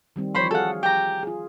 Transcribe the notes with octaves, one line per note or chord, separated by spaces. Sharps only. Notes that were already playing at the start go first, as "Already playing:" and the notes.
D#3 G3 C4
E3 F3 C5 C#5 B5 C6
F#4 G#4 A4 F5 F#5
G4 G5 A#5
F4 G#4